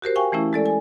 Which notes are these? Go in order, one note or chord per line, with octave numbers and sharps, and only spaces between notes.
F#4 G4 A#4 C5
F5 G5 G#5 C#6
E3 A3 C#4 E4
G#3 A4 D5
G#5